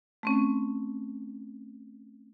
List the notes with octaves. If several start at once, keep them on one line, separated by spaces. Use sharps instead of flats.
A3 C4 C#4